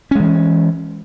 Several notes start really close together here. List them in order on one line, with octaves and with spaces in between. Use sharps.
C#4 G#3 E3